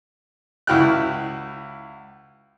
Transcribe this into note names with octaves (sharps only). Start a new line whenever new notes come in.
C#2 E4 F#4 G5 F6 F#6